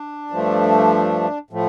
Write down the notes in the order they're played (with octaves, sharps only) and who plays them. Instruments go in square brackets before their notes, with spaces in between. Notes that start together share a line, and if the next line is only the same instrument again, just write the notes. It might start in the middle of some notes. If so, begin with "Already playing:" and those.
Already playing: [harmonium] D4
G2 F3 A3
A2 F3 A3